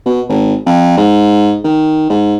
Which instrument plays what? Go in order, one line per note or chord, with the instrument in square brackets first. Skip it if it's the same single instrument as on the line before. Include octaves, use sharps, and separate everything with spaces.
[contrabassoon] B2
G#1
F2
G#2
D#3
G#2